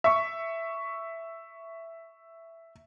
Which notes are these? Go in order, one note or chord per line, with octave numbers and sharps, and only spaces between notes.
E5 C#6